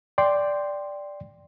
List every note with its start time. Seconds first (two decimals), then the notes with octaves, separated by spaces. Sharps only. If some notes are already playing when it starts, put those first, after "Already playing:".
0.18 D5 G5 C6